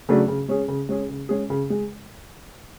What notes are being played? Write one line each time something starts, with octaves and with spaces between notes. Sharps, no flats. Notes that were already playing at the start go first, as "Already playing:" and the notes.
C#3 F#3 A3 D4
C#3
G#3 C#4 G#4
C#3
G#3 C#4 G#4
C#3
G#3 C#4 G#4
C#3
G#3